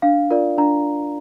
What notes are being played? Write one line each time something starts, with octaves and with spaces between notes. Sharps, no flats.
D4 F5
F4 A#4 D5
D4 A#5